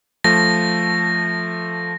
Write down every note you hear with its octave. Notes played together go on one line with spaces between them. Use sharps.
F3 A3 A#6